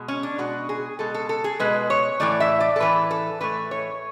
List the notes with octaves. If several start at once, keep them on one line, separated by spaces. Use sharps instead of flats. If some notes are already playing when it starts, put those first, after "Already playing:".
Already playing: B2 G#3
C#4
D4
B2 G#3 F#4
G#4
B2 G#3 A4
A4
A4
G#4
B2 G#3 B4
C#5
A2 E3 A3 D5
E5
D5
A4
A2 E3 A3 B4
A4
A2 E3 A3 B4
C#5